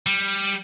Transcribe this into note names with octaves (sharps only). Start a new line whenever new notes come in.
G3